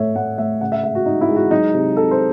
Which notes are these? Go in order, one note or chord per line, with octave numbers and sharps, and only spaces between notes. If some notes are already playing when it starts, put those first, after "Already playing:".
Already playing: A2 A3 C#5 E5
A2 F#5
A2 E5
C#3 F#5
E5
G#3 E5
F#4
G#3 D#4
E4
G#3
F#4
F#3 D#4
C3
C3 A4
C5